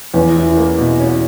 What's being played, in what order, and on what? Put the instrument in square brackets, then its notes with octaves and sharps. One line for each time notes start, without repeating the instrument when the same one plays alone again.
[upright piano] E2 [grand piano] C#4
[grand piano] E4
A#3
B2
C#4